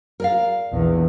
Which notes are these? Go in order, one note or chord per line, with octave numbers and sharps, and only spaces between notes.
A#4 D5 F5
A#1 E2